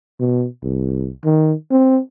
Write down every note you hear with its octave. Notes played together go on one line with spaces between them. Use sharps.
B2
C2
D#3
C4